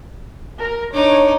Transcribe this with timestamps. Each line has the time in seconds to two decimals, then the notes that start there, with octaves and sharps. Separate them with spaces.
0.59 A#4
0.94 D4 D#4 C#5 D6